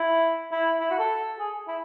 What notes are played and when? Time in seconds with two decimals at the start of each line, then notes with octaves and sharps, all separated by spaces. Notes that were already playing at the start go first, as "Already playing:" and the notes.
Already playing: E4
0.52 E4
0.80 E4
0.91 F#4
0.99 A4
1.39 G#4
1.68 E4